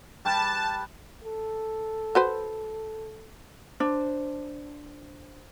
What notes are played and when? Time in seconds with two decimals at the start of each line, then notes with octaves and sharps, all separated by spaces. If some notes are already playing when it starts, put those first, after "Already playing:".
0.25 G3 G4 B4 A5
1.24 A4
2.15 F#4 B4 C5
3.80 D4 C5